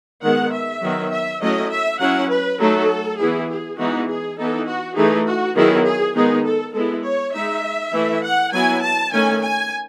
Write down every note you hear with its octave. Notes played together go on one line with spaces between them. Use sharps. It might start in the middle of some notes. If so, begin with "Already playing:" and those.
D#3 G#3 B3 F#5
E5
D#3 F#3 B3
E5
F#3 A3 C#4 E4 D#5
E5
F#3 C#4 E4 F#5
B4
F#3 A3 D#4 A4
E3 B3 E4 G#4
G#4
E3 G#3 B3 D#4 F#4
G#4
E3 B3 D#4 A4
F#4
E3 A3 D#4 G#4
F#4
D#3 F#3 B3 E4 G#4
G#4
D#3 G#3 B3 D#4 G#4
A4
G#3 B3 E4 A4
C#5
G#3 D#4 E5
E3 A3 E4
F#5
F#3 B3 E4 G#5
A5
D#3 A3 C#4 G#5
G#5